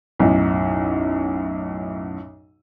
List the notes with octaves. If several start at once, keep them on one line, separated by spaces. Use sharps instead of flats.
B1 F#2 A2